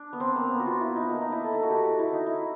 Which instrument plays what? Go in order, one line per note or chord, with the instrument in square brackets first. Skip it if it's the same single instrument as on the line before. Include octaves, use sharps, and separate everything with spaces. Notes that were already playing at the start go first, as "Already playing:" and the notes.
Already playing: [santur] D4
B3
C4
A#3
B3
F#4
F4
E4
D#4
A#3
D#4
E4
A4
A4
F#4
G4
F#4
E4
D#4
E4